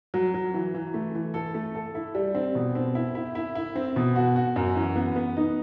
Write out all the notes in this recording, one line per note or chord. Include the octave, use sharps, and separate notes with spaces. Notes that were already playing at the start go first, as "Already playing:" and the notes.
F#3
F#3
E3
E3
A3
E3
A4
A3
A4
E4
G3
C4
B2
C4
E4
E4
E4
E4
C4
B2
F#4
F#4
F#2
E3
B3
B3
D#4